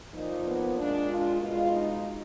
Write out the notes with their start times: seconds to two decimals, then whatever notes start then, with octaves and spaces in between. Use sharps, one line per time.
0.14 A#2 F3 A#3 D#4
0.46 B3
0.77 A#2 G#3 D4
1.09 F4
1.41 B2 G#3 F4
1.73 D#4